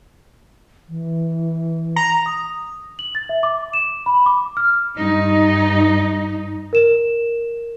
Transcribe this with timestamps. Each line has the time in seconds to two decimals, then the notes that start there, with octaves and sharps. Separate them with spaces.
0.89 E3
1.96 A#5
2.26 D#6
2.99 F#7
3.15 A6
3.29 E5
3.43 D6
3.73 E7
4.06 B5
4.26 D6
4.57 F6
4.95 G2 D#4
6.73 A#4 E7